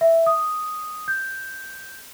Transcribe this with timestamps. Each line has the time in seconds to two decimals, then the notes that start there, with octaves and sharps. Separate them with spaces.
0.01 E5
0.26 D#6
1.08 G6